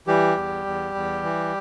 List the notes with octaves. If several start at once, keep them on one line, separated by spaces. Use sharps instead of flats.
E3 G3 G4
E2
E2
E2
E3